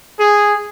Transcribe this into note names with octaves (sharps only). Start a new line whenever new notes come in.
G#4